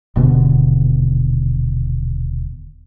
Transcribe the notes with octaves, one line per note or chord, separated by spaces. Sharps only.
D#1 B2 D3 B3